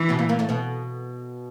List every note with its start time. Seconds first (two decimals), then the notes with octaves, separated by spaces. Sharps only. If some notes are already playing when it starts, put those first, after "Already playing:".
Already playing: E3
0.09 B2 B3
0.19 A#2 A#3
0.29 A#2 A#3
0.39 A2 A3
0.49 B2 B3